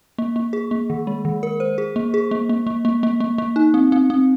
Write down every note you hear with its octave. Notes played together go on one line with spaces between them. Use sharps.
A#3
A#3
G#4
A#3
D#3
G#3
D#3
A#4
C5
G#4
A#3
G#4
A#3
A#3
A#3
A#3
A#3
A#3
A#3
D#4
C4
C4
C4